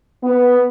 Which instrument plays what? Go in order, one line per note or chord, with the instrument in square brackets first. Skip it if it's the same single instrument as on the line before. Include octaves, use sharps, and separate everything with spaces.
[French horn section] B3